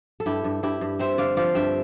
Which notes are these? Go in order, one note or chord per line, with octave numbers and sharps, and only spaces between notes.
A4
G2 E4 G4
G2
G2 E4 G4
G2
C4 C5 E5
D3 D5 F5
F3 D5 F5
G2 E5 G5